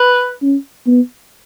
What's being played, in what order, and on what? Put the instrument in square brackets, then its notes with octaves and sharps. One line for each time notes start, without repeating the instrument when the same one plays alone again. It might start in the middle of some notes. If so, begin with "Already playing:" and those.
Already playing: [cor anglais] B4
[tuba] C#4
B3